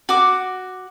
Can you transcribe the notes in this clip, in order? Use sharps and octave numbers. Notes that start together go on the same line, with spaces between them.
F#4 D6